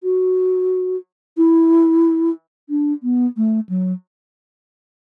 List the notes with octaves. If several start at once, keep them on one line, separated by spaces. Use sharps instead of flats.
F#4
E4
D4
B3
A3
F#3